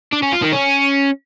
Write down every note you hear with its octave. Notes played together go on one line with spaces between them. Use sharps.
D4
C#4
F4
D#3
C#4